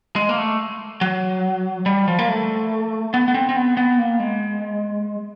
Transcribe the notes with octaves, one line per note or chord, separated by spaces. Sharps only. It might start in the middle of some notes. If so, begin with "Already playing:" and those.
G#3
A#3
A3
F#3
G3
F3
A#3
A3
B3
B3
C4
C4
B3
B3
A#3
G#3